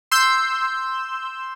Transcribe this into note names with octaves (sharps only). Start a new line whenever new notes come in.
C6 E6 G6